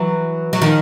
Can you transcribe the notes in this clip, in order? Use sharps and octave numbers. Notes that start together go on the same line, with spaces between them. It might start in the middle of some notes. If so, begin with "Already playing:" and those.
Already playing: E3 F#3
F#3
D#3 F3